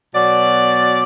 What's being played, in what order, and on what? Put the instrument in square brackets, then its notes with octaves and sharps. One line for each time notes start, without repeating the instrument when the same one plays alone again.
[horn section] B2 F#3 D5